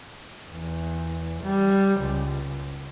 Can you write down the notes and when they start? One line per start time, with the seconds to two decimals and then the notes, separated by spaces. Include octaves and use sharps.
0.51 E2
1.44 G3
2.01 C#2